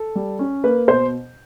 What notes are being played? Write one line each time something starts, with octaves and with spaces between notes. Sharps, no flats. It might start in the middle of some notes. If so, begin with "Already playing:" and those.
Already playing: A4
G3
C#4
A#3 B4
B2 C5